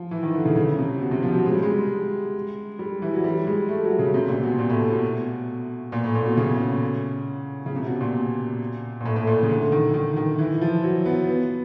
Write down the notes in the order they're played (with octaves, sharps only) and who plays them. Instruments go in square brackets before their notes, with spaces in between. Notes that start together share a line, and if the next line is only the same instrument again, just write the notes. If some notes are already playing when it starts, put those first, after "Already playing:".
Already playing: [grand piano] F3
E3
D#3
D3
C#3
C#3
C3
B2
C3
F3
F#3
G#3
G3
G#3
G3
E3
F#3
G3
G#3
A3
F#3
C#3
C3
A#2
B2
A#2
A2
B2
A#2
A2
A#2
B2
C#3
C#3
C3
B2
A#2
A#2
A2
A2
A#2
C#3
D3
D#3
D#3
D#3
E3
F3
F#3
B3
B3